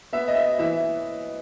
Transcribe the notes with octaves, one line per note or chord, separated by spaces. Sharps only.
B3 E5
D#5
E5
E3 E5